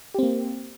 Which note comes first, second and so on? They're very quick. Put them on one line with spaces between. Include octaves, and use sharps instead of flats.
G4 C4 A#3